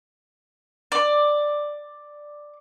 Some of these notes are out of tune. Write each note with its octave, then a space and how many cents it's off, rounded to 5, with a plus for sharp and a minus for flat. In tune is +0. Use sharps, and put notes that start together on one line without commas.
D5 +5